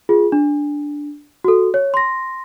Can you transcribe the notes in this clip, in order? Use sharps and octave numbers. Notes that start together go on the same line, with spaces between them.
F4 G#4
D4
F#4 A4
C#5
C6 A#6